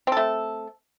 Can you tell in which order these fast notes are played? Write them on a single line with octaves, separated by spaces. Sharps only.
C4 A4 A3